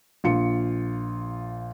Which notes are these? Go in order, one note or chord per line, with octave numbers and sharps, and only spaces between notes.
A#1 F4 C#7